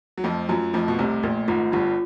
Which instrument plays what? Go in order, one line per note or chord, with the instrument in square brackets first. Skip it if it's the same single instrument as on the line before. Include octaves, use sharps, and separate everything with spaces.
[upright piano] F#3
[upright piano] F2 F3 [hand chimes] A3
[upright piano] F#2 F#3 [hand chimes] F4
[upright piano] F2 F3 [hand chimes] A3
[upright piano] B2
[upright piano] C2 C3 [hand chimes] A3
[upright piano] A#1 A#2 [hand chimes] A3
[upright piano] G#1 G#2 [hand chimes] F4
[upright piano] G1 G2 [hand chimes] F4